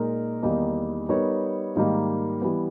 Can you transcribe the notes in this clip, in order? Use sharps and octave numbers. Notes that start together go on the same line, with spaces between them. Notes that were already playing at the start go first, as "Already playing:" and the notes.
Already playing: A#2 G#3 D#4 A#4
E2 D#3 G3 A#3 D#4
G3 B3 D#4 A#4 C#5
G#2 D#3 G3 A#3
E3 G3 B3